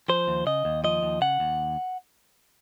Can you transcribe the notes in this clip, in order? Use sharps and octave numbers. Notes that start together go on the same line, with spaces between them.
F3 C5
D#2
C#3 D#5
D#2
F3 D#5
D#2
C#3 F#5
D#2